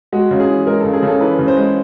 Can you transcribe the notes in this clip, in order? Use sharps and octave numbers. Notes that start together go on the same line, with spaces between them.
G#3 F#4
C#3
G#4
E3
G#3 A#4
C#3 A4
G#4
C#3 A4
E3 B4
C#3
C5
G#3